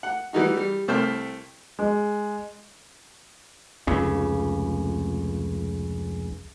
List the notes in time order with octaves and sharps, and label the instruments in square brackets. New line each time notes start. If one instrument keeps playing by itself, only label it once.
[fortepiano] F#5
E3 G3 D#4 F#4
G3
C2 A3 C5 E5 G5 F6
[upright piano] G#3
[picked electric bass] F1 C#2 C#3